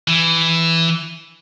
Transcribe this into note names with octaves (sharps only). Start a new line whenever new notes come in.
E3